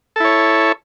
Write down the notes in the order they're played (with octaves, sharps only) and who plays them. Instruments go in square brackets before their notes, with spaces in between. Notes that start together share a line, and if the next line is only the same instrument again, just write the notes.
[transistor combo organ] A4
E4
C#5